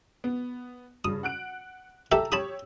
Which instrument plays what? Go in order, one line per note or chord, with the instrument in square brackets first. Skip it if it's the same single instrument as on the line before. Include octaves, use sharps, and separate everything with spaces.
[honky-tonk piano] B3
[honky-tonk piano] G2 C#3 [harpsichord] D#6
[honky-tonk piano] F#5 F#6 D7
[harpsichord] G4 A4 E5 [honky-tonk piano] A5 A#5 E6
[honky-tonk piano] G4 C#5 [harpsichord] A5 B5 D#6